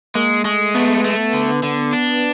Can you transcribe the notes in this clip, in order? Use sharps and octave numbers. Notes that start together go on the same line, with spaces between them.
G#3 A#3
G#3 A3
A3 B3
A3
D3
D3
D4